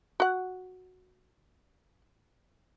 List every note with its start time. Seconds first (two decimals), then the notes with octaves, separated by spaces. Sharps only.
0.20 F#4 F#5